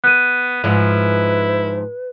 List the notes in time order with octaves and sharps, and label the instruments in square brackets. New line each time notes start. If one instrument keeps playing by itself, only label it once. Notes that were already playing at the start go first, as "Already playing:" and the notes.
[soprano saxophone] B3 [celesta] F#6 D#7
[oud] G#2 F3 [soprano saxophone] E4 [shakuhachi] B4